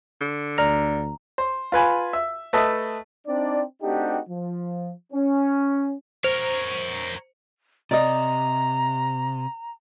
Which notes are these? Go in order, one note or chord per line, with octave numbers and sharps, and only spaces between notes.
D3
D2 D5 A#5 F6 A#6
C5
F4 B4 G#5 B5
E5
A3 B4 D#5 E5 A5
C4 D4 D#4 D5
A3 C4 D4 D#4 F#4 G4
F3
C#4
A#4 C5 C#5
C3 D5 D#5 A#5